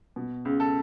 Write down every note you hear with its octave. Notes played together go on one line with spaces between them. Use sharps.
B2
C#2
A4